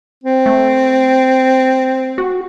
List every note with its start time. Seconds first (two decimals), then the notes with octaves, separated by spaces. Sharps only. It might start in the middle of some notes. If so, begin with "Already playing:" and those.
0.23 C4
0.46 A3
2.18 F#4